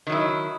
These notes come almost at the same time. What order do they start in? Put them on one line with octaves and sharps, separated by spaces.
D#3 F#3 E4